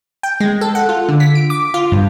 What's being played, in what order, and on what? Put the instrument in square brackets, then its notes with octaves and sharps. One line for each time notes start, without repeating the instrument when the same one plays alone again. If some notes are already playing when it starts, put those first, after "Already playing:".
[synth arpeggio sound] G5
G#3
A4
F#5
F4
D3
B6
D7
D6
F4
G2